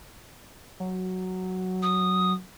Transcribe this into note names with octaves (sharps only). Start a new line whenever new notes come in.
F#3
D#6